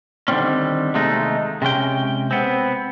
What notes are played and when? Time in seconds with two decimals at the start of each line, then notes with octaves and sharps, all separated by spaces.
0.28 D3 D#3 F#3 G3 C4 C#4
0.94 D#2 C3 G#3 A3 D#4
1.62 C3 G#3 C#4 G5
2.31 B3 C4